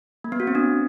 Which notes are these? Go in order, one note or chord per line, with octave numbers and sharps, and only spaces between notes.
A#3
B3
F#4
C4
D4